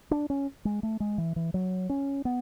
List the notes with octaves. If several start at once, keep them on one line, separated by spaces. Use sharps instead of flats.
D4
C#4
G#3
A3
G#3
E3
E3
F#3
C#4
B3